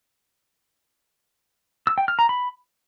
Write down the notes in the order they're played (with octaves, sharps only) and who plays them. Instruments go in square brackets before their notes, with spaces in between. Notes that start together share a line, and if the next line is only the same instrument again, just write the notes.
[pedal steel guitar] E6
G5
F6
A#5
B5